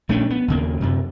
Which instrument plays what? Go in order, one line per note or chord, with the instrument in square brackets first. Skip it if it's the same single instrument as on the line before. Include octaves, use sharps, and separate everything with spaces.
[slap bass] A#1 A3 C#4 D4
B3
D#2 C#3 A#3
F#2 C3